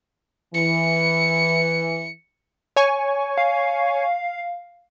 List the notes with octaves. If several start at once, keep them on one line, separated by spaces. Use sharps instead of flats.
E3 C#7
C#5 G#5 C#6
F5